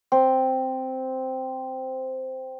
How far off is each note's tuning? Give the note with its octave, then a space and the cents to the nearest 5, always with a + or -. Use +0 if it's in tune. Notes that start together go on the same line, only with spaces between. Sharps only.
C4 -5